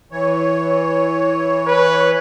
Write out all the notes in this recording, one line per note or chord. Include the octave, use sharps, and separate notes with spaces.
E3 C#5
B4